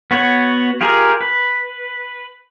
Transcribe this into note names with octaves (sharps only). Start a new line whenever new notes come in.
B3 F#4 C#5
F4 G4 G#4 A#4
B4